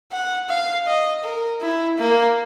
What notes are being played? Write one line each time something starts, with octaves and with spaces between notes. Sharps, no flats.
F#5
F5
D#5
A#4
E4
A#3